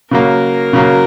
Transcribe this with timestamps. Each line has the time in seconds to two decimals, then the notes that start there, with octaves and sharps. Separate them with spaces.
0.11 C#3 F#3 A#3 A#4
0.73 C#3 F#3 A#3